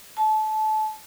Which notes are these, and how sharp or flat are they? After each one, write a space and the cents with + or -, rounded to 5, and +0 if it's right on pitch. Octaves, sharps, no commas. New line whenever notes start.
A5 -25